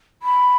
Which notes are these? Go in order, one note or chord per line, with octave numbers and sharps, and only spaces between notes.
B5